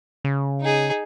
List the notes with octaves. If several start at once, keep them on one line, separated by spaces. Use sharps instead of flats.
C#3
D#4 G#4